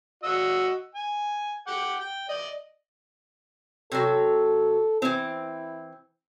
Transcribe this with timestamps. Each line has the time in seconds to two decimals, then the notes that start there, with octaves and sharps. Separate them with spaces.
0.23 F#4 D#5 E6
0.95 G#5
1.67 F#5 G5 D6
2.00 G5
2.29 D5 D#5
3.92 C3 F#3 A4
5.02 E3 C4 E4